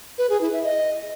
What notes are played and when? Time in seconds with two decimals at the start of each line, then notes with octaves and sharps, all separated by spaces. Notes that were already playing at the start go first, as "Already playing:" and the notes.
0.18 B4
0.30 G#4
0.41 E4
0.52 E5
0.64 D#5